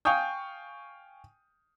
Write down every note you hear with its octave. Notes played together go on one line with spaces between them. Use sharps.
F5 G5 G#5 C#6 D#6 G6